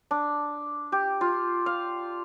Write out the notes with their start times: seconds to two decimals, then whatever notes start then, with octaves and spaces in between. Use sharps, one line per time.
0.11 D4
0.92 G4
1.21 F4
1.66 F5